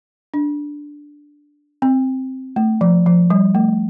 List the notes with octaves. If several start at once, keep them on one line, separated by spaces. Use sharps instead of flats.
D4
C4
A3
F3
F3
G3
A3